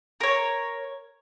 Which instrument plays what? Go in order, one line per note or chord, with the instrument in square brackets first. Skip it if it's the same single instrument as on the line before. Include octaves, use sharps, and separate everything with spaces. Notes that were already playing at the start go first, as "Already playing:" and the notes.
[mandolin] A#4 C#5